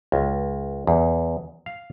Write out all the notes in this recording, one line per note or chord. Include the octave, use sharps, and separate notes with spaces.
C#2
E2
F5